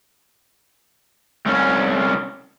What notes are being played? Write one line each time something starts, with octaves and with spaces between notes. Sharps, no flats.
C2 C#4